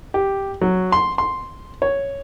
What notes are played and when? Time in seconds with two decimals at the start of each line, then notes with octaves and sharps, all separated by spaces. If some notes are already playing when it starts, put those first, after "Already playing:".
0.14 G4
0.61 F#3
0.92 C6
1.18 C6
1.82 C#5